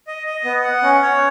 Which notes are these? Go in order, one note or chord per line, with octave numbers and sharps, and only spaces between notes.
D#5
D#5
B3
F#5
C#4
C#5